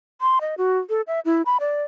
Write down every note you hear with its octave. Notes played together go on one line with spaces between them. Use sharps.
C6
D#5
F#4
A4
E5
E4
B5
D5